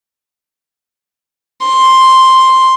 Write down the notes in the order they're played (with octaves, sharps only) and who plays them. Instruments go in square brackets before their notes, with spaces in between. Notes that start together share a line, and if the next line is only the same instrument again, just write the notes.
[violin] C6